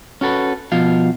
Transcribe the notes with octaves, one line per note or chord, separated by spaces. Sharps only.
C#4 F#4 A4 B4
B2 F3 F5